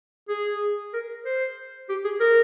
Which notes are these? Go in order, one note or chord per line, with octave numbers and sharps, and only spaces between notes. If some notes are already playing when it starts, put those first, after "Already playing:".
G#4
A#4
C5
G4
G#4
A#4